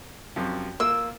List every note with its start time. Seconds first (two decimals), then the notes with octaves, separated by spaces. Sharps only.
0.36 F#2 C3 F3
0.80 A#3 F4 E6